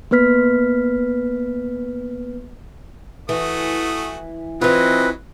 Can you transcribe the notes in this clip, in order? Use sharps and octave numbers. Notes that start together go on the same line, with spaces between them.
A#3 B3 B4 F6 B6
E3 A3 F#4 D#6
E3 F#3 C4 F4 B4 D#5